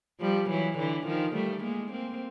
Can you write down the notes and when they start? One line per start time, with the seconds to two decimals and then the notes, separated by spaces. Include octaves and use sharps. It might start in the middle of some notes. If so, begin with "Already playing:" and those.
0.21 F3 G3
0.50 E3 F#3
0.78 D3 E3
1.07 D#3 F3
1.35 G3 A3
1.64 G#3 A#3
1.92 A#3 C4